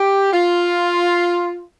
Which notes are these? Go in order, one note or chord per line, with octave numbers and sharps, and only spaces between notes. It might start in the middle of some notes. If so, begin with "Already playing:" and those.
Already playing: G4
F4